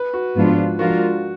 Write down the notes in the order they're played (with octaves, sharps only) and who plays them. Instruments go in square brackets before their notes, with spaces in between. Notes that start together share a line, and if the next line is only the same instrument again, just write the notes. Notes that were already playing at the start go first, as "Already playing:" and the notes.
Already playing: [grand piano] B4
F#4
[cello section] G#2 F3 B3 D4 F4
[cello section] F3 G#3 D4 F4 A#4 [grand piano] F#4